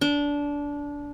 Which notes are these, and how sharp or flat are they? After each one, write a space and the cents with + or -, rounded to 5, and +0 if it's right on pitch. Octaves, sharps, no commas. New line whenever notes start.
D4 -20